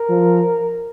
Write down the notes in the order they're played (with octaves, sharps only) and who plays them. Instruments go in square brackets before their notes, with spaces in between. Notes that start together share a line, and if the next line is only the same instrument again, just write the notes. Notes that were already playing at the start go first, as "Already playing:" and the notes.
Already playing: [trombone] A#4
[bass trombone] F3